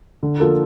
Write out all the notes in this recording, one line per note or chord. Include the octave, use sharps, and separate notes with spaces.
D3
F3 A#3 F4 A4